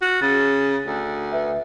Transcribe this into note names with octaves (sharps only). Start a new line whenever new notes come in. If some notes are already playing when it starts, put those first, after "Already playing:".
F#4
C#3 A6
D2
B4 E5